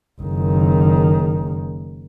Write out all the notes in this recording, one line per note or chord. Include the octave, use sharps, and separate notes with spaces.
F#1 D#3